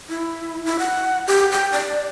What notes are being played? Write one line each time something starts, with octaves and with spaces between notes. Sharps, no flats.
E4
E4
F#5
G4
G5
D5